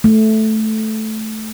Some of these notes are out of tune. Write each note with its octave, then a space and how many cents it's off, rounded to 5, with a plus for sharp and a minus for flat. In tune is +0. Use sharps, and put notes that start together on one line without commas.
A3 -10